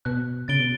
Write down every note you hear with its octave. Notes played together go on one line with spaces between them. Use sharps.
B2 F#6
C#3 A6 D7 G7
B2